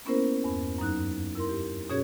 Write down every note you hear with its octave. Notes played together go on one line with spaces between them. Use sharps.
A#3 B3 C#4 E4 A#4 C5
E2 G2
F#2 F#3 D#4 F#6
E4 A#4 C6
G4
B2 C#4 F#4 G#4 C#5 G#6